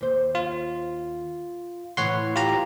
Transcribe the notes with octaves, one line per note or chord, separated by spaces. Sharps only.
D#2 C5
F4
A2 E3 C#5 F#5 C6
F4 G4 A#5